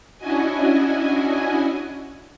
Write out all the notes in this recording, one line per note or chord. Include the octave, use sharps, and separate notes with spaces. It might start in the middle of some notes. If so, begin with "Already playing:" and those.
C#4 D4 E4 F#4 D#5 G#5